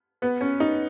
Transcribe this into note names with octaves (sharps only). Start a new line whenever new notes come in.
B3
C#4
D#4